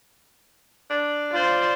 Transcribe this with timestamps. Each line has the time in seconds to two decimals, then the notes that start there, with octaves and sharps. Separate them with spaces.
0.90 D4
1.32 F4 C5 D5